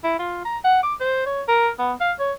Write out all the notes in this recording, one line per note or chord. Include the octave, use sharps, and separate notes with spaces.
E4
F4
A#5
F#5
D6
C5
C#5
A#4
B3
F5
C#5